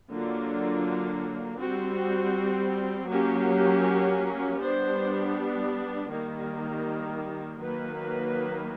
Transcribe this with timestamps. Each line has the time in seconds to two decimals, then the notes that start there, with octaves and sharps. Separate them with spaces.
0.11 D3 F#3 A#3 D4 F4
1.61 G3 C4 F#4
3.10 F#3 A#3 C#4 G4
4.60 G3 B3 D4 C5
6.10 D#3 G3 A#3
7.60 D#3 F#3 A#3 B4